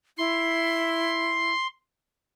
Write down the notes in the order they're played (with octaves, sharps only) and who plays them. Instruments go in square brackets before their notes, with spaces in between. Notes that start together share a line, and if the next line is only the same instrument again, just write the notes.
[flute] E4 [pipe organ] C6